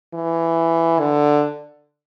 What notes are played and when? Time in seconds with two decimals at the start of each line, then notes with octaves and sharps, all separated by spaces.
0.14 E3
0.99 D3